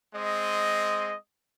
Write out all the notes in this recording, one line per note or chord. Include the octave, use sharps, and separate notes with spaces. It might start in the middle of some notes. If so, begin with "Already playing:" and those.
G#3 C4 D#5